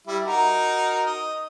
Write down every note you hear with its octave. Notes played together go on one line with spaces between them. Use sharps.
G3 E4
D#4 F#4 A#4
D#5